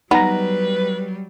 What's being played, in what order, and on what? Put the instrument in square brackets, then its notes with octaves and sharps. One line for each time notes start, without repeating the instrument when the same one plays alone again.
[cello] F#3 G3 [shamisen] B3 [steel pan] D#4 A#5 [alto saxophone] B4